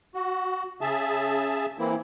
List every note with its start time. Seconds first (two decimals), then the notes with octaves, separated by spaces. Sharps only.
0.15 F#4
0.81 C#3 G#4 E5 A5
1.79 E3 A#3 C4 E4